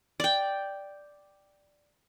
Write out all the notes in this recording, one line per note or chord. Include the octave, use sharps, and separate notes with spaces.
D5 G5